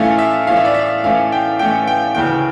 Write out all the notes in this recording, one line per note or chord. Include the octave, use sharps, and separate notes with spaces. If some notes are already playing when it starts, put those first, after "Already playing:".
Already playing: A2 E3 A3 C#4 F5
E5
A2 E3 A3 C#4 F5
E5
D5
E5
A2 E3 A3 C#4 F5
G5
A2 E3 A3 C#4 G5
G5
D2 C#3 E3 G5